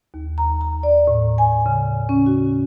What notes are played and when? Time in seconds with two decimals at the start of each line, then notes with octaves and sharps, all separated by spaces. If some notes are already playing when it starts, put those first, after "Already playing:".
0.14 D#2
0.38 A#5
0.61 A#5
0.83 D5
1.07 A2
1.38 G#5
1.66 C#3
2.09 C#4
2.26 F#4